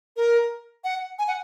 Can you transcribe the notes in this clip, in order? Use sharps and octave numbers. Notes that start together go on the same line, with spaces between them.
A#4
F#5
G#5
F#5